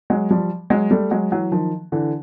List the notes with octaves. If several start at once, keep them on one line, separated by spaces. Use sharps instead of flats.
F#3 G#3
F3 G3
F#3 G#3
G3 A3
F#3 G#3
E3 F#3
D#3 F3
D3 E3